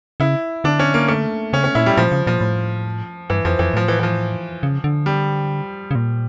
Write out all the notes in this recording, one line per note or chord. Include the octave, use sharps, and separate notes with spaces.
C#3 E4
D3 D4
C#4
A#3
A3
C#3 C#4
C#4
A#2 E4
G3
A#2 F3
C#3
A#2 F3
A2
G2 E3
F2 F3
F2 E3
A2 F3
E3
E3
F3
C#3
D3
G3
C#3
A#2